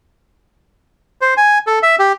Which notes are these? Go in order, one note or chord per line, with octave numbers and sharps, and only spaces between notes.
C5
G#5
A4
E5
G4